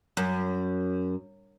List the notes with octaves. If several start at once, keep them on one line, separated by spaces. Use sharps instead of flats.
F#2